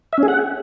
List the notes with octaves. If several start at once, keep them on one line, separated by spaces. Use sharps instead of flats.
E5
C#4
G#4
F#5